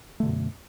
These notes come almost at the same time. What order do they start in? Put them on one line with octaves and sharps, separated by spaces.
A3 D3 B2 F#2